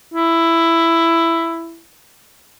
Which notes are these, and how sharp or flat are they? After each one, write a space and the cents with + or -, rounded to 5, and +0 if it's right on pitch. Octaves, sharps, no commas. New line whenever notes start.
E4 +10